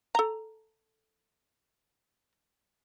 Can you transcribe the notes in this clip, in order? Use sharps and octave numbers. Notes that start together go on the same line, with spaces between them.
A4 A#5